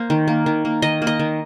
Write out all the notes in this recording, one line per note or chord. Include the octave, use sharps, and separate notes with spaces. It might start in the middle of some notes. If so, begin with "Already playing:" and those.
Already playing: A#3 C5
D#3
A#3
D#3
A#3
D#3 D#5
A#3
D#5
D#3